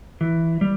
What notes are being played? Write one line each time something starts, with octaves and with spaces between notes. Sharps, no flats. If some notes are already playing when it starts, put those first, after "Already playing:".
E3
G3